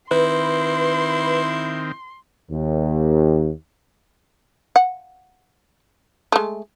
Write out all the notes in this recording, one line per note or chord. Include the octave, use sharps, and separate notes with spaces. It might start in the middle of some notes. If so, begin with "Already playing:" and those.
D#3 C4 E4 B4 C6
D#2
F#5
G#3 A3